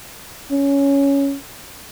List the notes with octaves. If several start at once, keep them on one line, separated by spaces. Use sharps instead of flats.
C#4